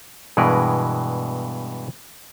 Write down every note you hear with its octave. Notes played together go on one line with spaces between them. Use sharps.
G2 B2 E3 G#3 A#4 B4